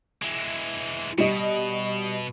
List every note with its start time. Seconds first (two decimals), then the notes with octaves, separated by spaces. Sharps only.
0.22 E3 G#3
1.18 B2 G3 D#5